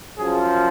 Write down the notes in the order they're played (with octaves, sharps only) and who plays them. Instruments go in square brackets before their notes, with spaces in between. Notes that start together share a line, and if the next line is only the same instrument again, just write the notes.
[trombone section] F#2 F3 G#4